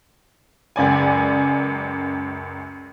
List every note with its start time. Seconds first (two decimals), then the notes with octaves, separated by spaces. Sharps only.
0.76 C#2 F#2 D5 G#5